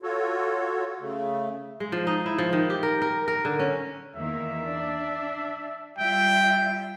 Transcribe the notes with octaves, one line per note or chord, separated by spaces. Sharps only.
F4 F#4 A4 C#5
C#3 A3
G#3
F3
D#4
E4
F3
D#3
G4
A#4
A#4
A#4
D3
C#4
E2 D#3 A#3 E5
D4
G3 F4 E5 G5